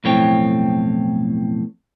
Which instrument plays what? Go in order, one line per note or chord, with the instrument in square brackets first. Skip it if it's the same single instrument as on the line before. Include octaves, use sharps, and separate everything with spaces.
[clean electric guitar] B1 F2 A2 C4 C#5 G5